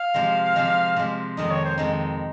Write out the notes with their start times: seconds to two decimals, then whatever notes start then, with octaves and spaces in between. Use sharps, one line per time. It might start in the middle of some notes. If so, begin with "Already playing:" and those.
Already playing: F5
0.14 C3 F3 G#3
0.56 C3 F3 G#3
0.96 C3 F3 G#3
1.37 F2 D#3 G#3 D#4 D#5
1.51 C#5
1.65 C5
1.78 F2 D#3 G#3 D#4